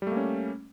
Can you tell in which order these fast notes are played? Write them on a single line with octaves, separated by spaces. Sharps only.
G3 A3 A#3 C#4